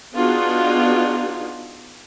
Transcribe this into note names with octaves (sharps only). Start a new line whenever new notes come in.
B3 D4 D#4 F4 F#4 G#4